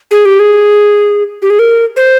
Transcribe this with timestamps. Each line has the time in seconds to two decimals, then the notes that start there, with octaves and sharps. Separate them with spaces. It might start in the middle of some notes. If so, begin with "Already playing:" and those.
0.11 G#4
0.25 G4
0.39 G#4
1.42 G4
1.50 G#4
1.59 A#4
1.96 C5